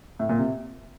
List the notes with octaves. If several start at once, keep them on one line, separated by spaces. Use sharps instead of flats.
A2
A#2
C3